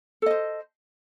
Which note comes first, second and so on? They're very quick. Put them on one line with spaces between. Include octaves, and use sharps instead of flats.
A4 D#5 C5